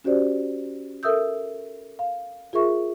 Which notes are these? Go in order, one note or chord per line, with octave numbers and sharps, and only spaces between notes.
C#4 F#4 G4 C5 D5
A4 A#4 E5 D#6 E6 G6
F5
F4 G#4 A#4 E5 C#6